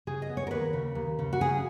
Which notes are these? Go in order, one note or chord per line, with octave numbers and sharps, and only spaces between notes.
C#3 G#4
D#5
B3
C#5
A#4
D#2 B4
C#3
D#2
C#3
F#4
C#3 G#4